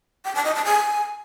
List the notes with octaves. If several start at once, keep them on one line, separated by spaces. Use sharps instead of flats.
G5
A5
D#5
A5
G#5